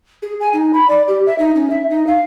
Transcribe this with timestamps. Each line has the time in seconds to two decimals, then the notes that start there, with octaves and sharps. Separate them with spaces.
0.22 G#4
0.40 G#5
0.53 D#4
0.74 B5
0.89 D5
1.08 G4
1.26 E5
1.39 D#4
1.55 C#4
1.70 E5
1.90 D#4
2.07 F5